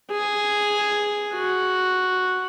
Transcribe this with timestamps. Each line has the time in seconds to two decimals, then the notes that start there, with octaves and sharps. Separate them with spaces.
0.12 G#4
1.36 F#4